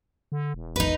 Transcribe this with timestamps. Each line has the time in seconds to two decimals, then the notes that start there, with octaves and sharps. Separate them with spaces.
0.32 D3
0.54 E1
0.76 A1 E2 D#4 B4